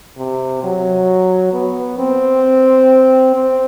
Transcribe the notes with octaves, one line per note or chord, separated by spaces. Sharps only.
C3
F#3
B3
C4
C4